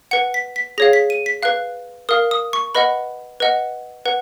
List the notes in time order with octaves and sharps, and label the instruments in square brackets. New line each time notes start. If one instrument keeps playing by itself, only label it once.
[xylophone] B4 F#5 C#7
B6
B6
G#4 C#5 F5 A#6
B6
D#7
B6
B4 F5 F#6
A#4 F5 D#6
D#6
C#6
B4 D#5 F#5 B5
B4 D#5 F#5
B4 F#5